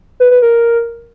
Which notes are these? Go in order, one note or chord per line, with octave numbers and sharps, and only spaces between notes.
B4
B4
A#4